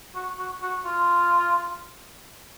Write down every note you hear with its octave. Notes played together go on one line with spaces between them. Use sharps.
F#4
F#4
F#4
F4